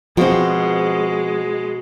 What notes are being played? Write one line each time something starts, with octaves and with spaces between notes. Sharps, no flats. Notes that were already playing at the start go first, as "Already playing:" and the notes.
B2 F3 G#3 C4 C5